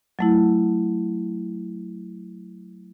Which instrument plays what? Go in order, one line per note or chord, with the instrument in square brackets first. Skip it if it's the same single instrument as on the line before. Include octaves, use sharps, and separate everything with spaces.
[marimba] F#3 A3 E4